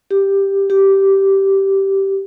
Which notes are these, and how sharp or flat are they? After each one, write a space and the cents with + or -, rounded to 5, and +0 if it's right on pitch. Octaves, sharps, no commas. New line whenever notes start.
G4 +5
G4 -10